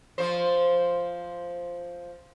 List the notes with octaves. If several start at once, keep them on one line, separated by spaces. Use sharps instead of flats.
F3 C5